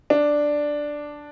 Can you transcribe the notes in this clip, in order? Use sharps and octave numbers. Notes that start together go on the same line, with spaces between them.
D4